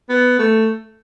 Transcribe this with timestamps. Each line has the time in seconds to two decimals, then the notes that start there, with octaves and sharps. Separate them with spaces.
0.09 B3
0.39 A3